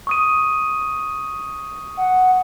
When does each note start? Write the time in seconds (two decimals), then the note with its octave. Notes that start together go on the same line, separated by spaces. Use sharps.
0.07 C#6 D#6 D#7
1.97 F#5